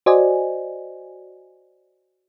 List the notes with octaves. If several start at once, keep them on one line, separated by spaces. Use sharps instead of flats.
F#4 C5 D5 D#5 G#5